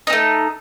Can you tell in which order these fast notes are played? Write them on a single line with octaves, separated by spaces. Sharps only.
D#4 C4 A3